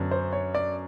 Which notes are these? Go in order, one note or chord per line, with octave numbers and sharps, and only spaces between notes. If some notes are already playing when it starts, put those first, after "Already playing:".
Already playing: F#2 D3 B3 D4
C5
C#5
D5